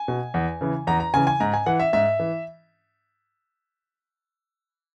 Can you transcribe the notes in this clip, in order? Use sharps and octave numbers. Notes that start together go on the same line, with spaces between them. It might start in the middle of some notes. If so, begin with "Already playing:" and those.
Already playing: G#5
B2
E2
C#3 E3
E2 A#5
A#5
C#3 E3 G#5
G#5
G#2 A#5
G#5
E3 F#5
E5
G#2 E5
E3